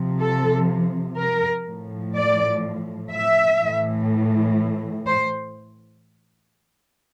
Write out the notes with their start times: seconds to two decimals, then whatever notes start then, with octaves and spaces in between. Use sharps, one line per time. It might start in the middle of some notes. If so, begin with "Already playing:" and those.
Already playing: C3 F3
0.21 A4
1.18 A#4
1.67 A2 F3
2.15 D5
3.12 E5
3.60 A2 E3
5.06 C5